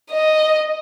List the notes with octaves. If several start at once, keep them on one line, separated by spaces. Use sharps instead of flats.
D#5